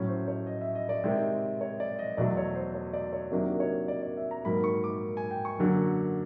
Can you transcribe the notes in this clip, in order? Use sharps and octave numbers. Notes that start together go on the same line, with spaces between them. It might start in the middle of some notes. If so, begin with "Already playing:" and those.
Already playing: A2 F#3 A3 C#4 C#5
C5
C#5
D#5
E5
D#5
D5
C3 D#3 G#3 C4
C#5
D5
D#5
E2 B2 F#3 A3 D5
C#5
C5
C#5
D5
C#5
C3 D#3 F#3 A#3 D4 D5
C#5
D5
D5
E5
A#5
G#2 D#3 F#3 A#3 B5
C#6
D6
G#5
G5
C#6
F#2 D3 F#3 A#3